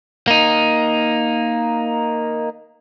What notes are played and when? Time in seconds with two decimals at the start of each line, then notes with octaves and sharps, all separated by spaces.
0.28 A#3 D#4